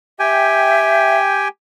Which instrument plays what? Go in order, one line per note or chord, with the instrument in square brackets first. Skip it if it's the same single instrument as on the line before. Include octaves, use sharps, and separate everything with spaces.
[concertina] G4 G5 G#5 [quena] E5